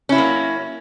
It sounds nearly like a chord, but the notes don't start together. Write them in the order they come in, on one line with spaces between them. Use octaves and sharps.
C#4 E4 F#3 A#3